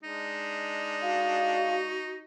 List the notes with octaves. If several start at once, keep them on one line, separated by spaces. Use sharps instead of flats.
G#3 D4 D#4
F#4 F5